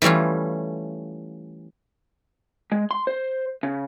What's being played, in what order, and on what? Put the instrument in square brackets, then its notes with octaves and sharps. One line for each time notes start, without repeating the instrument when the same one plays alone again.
[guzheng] E3 G3 A3 C#4 F4
[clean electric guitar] G#3
C6
C5
C#3